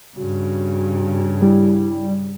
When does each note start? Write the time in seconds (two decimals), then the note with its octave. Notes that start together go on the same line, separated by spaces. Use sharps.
0.17 G2 C#3 F#4
1.42 G3 E4